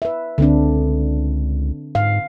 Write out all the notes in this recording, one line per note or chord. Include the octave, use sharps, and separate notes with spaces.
B4 E5
C#2 D3 C4 D4
G#2 F5